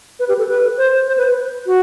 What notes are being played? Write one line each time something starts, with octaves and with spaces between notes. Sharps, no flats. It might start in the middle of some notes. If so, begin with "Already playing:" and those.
B4
G4
A4
B4
C5
C5
B4
F#4